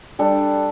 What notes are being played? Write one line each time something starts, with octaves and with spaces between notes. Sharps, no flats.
G3 D4 A4